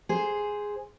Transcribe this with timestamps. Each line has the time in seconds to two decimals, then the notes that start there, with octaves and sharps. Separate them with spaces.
0.09 G#4 C5